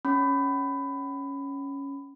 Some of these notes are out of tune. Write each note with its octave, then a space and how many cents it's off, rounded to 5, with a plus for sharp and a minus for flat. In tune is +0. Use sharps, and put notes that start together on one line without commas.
C#4 +0 B5 +20